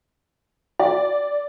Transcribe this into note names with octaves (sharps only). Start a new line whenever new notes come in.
D5